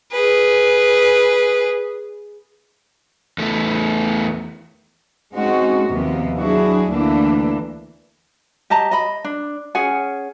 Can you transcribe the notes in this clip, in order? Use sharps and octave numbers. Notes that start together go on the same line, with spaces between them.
G#4 B4
E2 A3
G#3 C4 C#4 D#4 F#4
D#2 C3 F3 A#3 B3
F#3 D4 E4 F#4 G#4
D2 E3 A3 A#3 D4
G4 D#5 A5 A#5
D#5 B5
D4
C#4 G#4 F#5 G#5